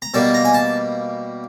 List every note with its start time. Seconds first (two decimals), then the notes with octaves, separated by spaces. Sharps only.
0.02 A#5
0.14 B2 G3 A#3 A5
0.34 A#5
0.45 G#5
0.54 A5